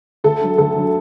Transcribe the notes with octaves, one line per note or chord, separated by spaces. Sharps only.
D2 A4
D3 F#3
D2 A4
D3 F#3